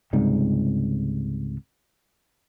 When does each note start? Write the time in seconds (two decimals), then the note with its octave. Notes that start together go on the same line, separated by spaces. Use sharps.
0.13 C#2 G#2 C3 G3